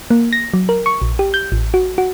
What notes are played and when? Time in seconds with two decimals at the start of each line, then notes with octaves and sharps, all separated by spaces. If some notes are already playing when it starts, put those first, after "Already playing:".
0.10 A#3
0.33 A#6
0.54 F#3
0.69 A#4
0.86 C#6
1.02 A#1
1.19 G4
1.34 G6
1.52 A1
1.74 F#4
1.98 F#4